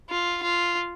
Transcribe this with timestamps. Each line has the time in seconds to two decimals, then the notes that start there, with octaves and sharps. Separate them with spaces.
0.10 F4
0.43 F4